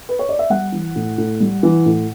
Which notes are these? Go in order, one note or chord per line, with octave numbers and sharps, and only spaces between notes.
B4
C#5
D5
E5
G3 F#5
E3
A2
A2
G3
E3
A2